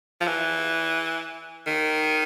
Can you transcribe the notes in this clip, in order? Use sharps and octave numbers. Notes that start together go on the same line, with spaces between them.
F3
E3
D#3